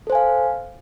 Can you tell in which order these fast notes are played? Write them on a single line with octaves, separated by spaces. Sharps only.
A4 C5 G#5 F5